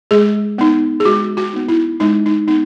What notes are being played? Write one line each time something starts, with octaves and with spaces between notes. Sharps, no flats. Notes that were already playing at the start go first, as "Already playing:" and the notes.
G#3 G#4
B3 D#4
G#4
G#3 F#4
F#4
B3 D#4
E4
G#3 D#4
D#4
B3 D#4